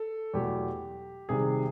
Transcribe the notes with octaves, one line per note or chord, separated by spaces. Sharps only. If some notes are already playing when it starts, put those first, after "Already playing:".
Already playing: A4
E2 B2 F#3 A3 G4
C3 D#3 G3 G#4